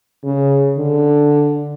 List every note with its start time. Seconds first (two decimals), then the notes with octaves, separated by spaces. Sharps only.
0.24 C#3
0.78 D3